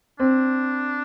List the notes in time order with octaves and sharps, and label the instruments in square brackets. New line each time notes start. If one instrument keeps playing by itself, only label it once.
[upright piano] C4 [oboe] D4